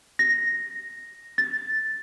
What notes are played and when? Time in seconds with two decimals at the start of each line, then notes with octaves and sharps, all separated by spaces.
0.19 A#6
1.38 A6